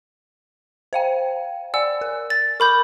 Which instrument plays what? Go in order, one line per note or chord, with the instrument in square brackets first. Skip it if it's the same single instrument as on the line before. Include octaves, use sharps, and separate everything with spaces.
[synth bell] C5 F5 G5
[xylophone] D5 F#5 E6 [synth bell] G#5
[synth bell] A#4
[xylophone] A6
[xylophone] A#4 B5 G6 [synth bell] C#6 D6